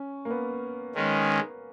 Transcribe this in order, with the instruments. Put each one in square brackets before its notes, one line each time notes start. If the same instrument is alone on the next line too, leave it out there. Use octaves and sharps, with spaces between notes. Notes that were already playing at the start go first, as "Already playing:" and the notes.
Already playing: [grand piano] C#4
A#3
B3
[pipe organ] D#3 G#3 C#4